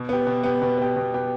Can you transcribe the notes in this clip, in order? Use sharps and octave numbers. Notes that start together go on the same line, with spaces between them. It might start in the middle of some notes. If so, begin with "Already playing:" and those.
Already playing: B2
B3 G4
B2
B3 G4
B2
B3 G4
B2
B3 G4